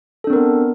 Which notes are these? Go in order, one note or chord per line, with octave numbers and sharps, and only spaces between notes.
B3 C4 D4 A4 A#4